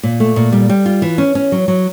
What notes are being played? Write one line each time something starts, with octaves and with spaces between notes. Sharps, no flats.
A#2
A3
A#2
G3
G3
F4
E3
C#4
C#4
F#3
F#3